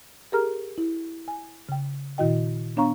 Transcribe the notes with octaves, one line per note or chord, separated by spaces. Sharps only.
G4 G#4 A#4 A#5 F6
E4
G#5
C#3 G5
A#2 D#3 E4 F#4 D#5 G5
B3 D4 C#5 F5 A#5 C#6